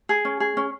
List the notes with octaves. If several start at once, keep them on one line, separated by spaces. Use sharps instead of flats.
G#4
C#4
G#4
C#4